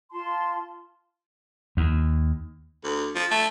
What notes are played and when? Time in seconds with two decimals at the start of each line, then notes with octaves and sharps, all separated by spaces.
0.11 F4 A5 C6
1.77 D#2
2.84 D2
3.15 F3
3.31 A3